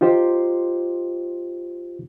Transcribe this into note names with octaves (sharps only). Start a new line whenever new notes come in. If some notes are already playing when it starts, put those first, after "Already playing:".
D#4 F4 G4 C5